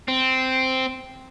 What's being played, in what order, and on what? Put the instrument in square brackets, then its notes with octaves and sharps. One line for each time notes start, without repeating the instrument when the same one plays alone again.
[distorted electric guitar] C4